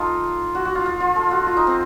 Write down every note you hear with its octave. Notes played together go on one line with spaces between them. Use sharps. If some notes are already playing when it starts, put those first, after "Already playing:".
Already playing: D#4 F4 A4
F#4
F#4
F4
F4
F4
A4
F#4
F4
D#4
C4